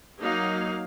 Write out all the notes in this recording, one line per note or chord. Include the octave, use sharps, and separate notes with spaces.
F#3 A#3 D#4 F5